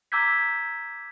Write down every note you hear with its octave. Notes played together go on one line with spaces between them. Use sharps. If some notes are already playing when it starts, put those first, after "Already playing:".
A#5 D6 E6 G6 G#6 B6